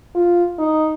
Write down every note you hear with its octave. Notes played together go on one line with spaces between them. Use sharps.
F4
D#4